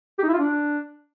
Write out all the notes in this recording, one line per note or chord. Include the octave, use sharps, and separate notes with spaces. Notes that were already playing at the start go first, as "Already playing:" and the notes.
G4
D#4
E4
F4
D4